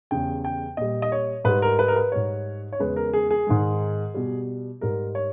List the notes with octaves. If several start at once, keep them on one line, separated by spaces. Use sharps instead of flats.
E2 C#3 G3 G5
G5
A#2 G3 D#5
D#5
C#5
G#2 G3 B4
A#4
B4
A#4
B4
G#2 G3 C#5
C#5
E2 C#3 G#3 B4
A#4
G#4
G#4
G#2 D#3 G#3
B2 G3
G#2 G3 A#4
C#5